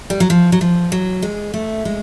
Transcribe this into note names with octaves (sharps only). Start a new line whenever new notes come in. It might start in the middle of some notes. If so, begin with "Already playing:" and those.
G3
F#3
F3
F#3
F3
F#3
G#3
A3
G#3